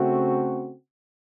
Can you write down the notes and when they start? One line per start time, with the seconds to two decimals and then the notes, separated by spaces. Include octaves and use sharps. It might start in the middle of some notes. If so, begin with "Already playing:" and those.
Already playing: C#3 A3 C4 F#4